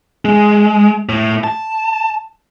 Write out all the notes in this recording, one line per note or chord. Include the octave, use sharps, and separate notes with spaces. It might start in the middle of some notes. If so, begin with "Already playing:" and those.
G#3
A2
A5